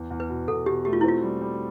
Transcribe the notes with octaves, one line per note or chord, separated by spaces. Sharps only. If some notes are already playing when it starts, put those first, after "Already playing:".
Already playing: E2
E2
B4
B2
E2 A4
B2 G4
A3 G4
F4
E4
C4 F4
G3
G3